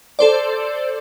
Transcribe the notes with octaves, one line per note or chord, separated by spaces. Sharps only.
A4 C5 D5